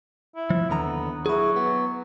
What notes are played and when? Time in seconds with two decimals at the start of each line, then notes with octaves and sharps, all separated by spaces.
0.36 E4
0.50 F3
0.70 D#2 D3 B3 A#5
1.26 F#3 E4 G#4
1.56 B3